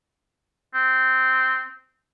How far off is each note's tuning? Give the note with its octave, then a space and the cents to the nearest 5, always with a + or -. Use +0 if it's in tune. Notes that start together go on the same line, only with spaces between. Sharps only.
C4 -10